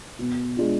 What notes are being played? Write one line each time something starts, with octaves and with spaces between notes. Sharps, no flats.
B2
G#3 D4 F4